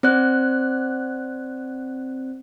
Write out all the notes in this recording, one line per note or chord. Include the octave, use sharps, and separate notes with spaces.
C4 C5 D5 F#6